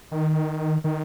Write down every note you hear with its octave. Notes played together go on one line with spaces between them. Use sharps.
D#3
D#3